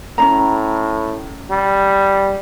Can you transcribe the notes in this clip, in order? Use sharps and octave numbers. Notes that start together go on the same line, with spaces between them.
A2 C#4 D4 A#5
G3